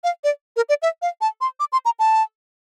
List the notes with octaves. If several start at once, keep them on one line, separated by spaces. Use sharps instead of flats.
F5
D5
A#4
D5
E5
F5
A5
C6
D6
C6
A#5
A5